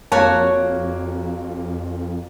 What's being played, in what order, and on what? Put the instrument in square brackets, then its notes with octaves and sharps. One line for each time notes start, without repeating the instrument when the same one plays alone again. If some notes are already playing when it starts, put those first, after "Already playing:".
[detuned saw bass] F2 [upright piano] A#3 [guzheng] F#4 C#5 [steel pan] A5